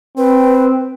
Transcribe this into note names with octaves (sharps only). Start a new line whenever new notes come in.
C4 B4